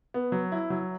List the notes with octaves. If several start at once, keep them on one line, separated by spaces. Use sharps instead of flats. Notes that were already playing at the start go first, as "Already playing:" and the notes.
B3
F#3
E4
F#3